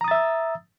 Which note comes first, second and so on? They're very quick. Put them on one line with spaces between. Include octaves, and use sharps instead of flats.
A#5 D#6 A6 E5 E6